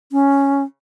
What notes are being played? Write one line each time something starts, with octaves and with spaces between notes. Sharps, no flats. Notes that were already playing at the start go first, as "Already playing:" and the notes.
C#4